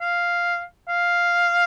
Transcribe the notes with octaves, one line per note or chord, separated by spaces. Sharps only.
F5
F5